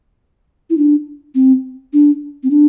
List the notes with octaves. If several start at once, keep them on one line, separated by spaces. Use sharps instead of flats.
E4
D4
C4
D4
C4
D4